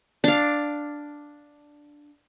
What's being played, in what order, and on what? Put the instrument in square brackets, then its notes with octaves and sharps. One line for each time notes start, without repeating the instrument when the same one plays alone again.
[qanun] D4 F5